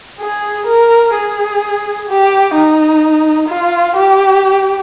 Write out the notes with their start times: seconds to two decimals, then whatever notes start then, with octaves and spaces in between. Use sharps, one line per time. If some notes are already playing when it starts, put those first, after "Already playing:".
0.20 G#4
0.67 A#4
1.14 G#4
2.08 G4
2.54 D#4
3.48 F4
3.96 G4